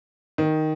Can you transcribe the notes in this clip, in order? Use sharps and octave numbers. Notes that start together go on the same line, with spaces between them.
D#3